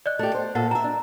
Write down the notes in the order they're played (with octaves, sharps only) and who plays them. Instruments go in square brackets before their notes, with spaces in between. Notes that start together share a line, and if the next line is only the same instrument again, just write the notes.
[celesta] D5 D#5 F#6
[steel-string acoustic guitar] A3 G4
C5
[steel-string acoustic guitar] A#2 A4 [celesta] F#5
[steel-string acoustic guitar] E5 G5 [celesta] A#5
[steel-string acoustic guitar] D4